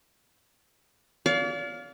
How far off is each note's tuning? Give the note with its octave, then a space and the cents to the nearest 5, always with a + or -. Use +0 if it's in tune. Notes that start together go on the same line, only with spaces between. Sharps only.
D5 -40 F5 +10